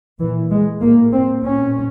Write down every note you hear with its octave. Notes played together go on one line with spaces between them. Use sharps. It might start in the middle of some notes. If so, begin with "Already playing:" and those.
A#2 E3
G#3
A2 A#3
C4
A#2 C#4